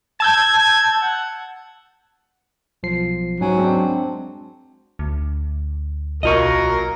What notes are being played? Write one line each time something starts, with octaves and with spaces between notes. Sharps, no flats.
A5 E6 G6 G#6
G#6
F#5
B1 F3 C7
G#2 F#3 C#4 G#5
G#3 C4 D4
D2
B1 F#3 A#3 F4 A#4 D#5 C#6